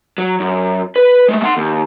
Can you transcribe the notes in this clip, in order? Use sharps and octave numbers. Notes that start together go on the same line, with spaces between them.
F#3
F#2
B4
G#3 A3
F#5 C6
D#2